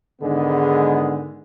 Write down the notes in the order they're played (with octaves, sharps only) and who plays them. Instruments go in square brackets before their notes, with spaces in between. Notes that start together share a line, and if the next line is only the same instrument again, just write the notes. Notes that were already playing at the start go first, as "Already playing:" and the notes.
[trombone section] G#2 D3 D#3 G#3 B3 G#4